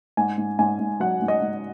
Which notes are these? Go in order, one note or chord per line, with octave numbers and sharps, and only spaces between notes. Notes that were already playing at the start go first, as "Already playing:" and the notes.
G#2 G#5
G#2
G#2 G#5
G#2
F#3 F#5
G#2
D#5
G#2